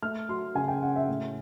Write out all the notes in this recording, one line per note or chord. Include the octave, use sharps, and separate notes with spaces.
A3 F6
F#3 C6
C#3 G#5
G5
C#4 F#5
E5
A2